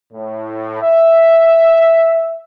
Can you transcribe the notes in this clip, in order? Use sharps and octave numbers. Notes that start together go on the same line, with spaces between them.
A2
E5